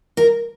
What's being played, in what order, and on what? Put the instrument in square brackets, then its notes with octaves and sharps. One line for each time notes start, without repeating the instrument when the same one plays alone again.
[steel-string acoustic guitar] A#4